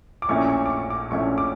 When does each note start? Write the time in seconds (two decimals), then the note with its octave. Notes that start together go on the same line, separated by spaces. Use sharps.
0.22 D6
0.29 A#1 A#2 A3 C#4 E4 C#6
0.49 C#6
0.66 D6
0.70 C#6
0.90 D6
1.11 A#1 A#2 A3 C#4 E4 C#6
1.38 D6